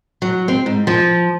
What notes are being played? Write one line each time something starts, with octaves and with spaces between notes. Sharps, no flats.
F#3
C4
G#2
F3